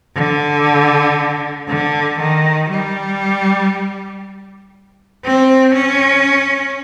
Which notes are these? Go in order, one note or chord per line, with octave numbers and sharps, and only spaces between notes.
D3
D3
D#3
G3
C4
C#4